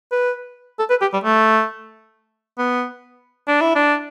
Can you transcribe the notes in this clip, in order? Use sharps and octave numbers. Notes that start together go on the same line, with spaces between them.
B4
A4
B4
G4
G3
A3
B3
D4
E4
D4